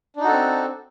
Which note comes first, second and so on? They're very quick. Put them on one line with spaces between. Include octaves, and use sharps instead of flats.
D4 D#4 F#4 A4 C4